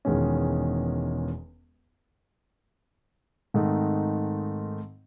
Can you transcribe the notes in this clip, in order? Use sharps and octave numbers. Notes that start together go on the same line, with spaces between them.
E1 E2 D#3 G#3 C#4
G#2 D#3 A3 C4 D#4